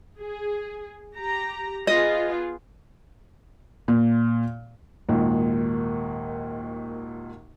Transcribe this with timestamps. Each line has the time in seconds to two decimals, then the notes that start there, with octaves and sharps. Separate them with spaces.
0.19 G#4
1.16 G4 A#5
1.87 B3 F4 G#4 D#5
3.88 A#2
5.09 G#1 D#2 A#2